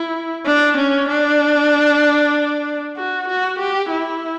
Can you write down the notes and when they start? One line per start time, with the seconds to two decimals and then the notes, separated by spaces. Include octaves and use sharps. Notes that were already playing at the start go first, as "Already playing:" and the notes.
Already playing: E4
0.46 D4
0.77 C#4
1.08 D4
2.96 F#4
3.28 F#4
3.59 G4
3.90 E4